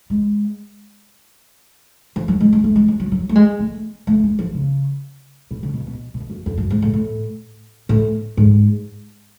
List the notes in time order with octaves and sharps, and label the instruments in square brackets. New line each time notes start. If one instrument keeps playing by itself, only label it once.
[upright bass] G#3
F3
F#3
G#3
G#3
A3
G#3
F#3
F#3
F#3
A3
G#3
A3
A3
G#3
F3
C#3
B2
C#3
B2
B2
B2
F#2
F2
F#2
G#2
A2
A2
A2
G#2